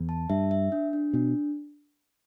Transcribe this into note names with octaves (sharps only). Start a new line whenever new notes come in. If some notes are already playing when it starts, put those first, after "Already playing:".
Already playing: E2
A5
G2 E5
E5
D4
D4
B2 D4